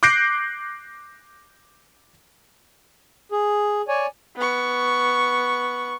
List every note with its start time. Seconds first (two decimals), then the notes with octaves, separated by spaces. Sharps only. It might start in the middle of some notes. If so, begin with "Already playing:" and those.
0.03 D6 F#6 G6 A#6 C7 D7
3.32 G#4
3.88 C#5 D5 G#5
4.36 B3 C#6